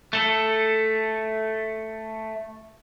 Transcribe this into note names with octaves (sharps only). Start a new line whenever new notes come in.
A3 A4